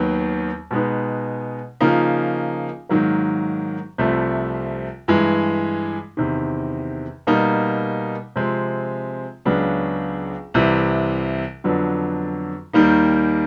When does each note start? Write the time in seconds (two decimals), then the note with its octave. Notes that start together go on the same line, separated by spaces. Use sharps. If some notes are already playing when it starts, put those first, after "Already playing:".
Already playing: D#2 D#3 F#3 B3
0.71 B2 G#3 B3 D#4
1.81 C#3 F3 A#3 D#4
2.89 G#2 D#3 F#3 A#3
3.98 C2 C3 F3 A3
5.08 G2 E3 G#3
6.17 E2 C3 D#3
7.27 B2 G3 A#3 D#4
8.36 C3 F3 G#3 C4
9.45 C#2 C#3 F#3 B3 D4
10.54 C2 C3 E3
11.64 F2 D3 F#3 B3 D4
12.73 D#2 D#3 G3 A#3 D#4